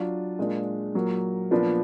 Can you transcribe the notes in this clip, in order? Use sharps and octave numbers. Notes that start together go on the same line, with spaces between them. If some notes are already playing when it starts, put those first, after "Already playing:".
Already playing: F#3 D4 F4
A#2 G#3 D4 F4
A#2 F#3 A#3
A#2 F3 B3 D4 F4